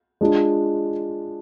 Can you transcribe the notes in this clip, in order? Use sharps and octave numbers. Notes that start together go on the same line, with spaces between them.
G#3 D4 F4